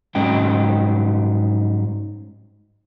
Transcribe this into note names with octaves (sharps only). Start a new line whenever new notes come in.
G#2 F#3 G3 C#4 D#5 G5